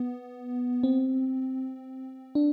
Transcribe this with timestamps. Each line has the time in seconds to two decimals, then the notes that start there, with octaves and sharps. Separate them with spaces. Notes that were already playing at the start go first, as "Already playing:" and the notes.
Already playing: B3
0.83 C4
2.35 D4